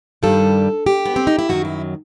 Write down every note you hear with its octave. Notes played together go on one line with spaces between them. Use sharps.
G2 D#3 G3 A4
G4
B3
C4
D#4
E4
F#2 D#3 F#3 F#4
E4